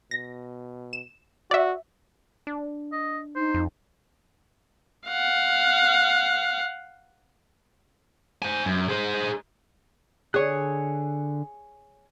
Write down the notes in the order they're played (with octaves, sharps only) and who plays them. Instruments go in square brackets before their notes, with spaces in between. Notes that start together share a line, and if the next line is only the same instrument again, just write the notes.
[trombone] B2 [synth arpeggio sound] A#6
[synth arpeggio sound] E7
[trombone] F#4 [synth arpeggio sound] D5 E5
[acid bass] D4
[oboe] D#5
[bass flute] D#4 [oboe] C5
[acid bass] F2
[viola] F5 F#5
[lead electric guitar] C5 G#5
F#2
G#4 C5
[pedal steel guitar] D3 F#6 [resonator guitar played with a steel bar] G#4 C#5